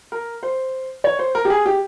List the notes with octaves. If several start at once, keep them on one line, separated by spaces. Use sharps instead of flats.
A#4
C5
C#5
C5
A#4
G4
G#4
G4